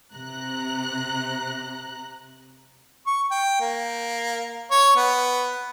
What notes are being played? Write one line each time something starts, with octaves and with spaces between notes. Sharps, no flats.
C3 A#5 F#6
C#6
G5
A#3
C#5
B3